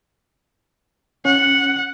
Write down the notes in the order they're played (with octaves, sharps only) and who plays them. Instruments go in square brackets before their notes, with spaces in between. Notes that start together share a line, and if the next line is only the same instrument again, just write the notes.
[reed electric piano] C#4 [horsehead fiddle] F#5